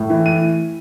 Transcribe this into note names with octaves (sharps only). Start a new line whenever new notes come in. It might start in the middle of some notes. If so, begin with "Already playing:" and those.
Already playing: A2
E3
D#7